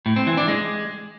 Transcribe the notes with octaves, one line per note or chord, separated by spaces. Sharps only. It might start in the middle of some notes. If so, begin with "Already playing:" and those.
A2
C4
E3
D4
G#3